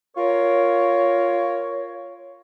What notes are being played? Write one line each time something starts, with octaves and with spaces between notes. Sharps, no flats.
F4 A#4 C#5